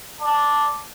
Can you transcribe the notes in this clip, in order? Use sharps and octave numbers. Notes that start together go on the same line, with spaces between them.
D5 A5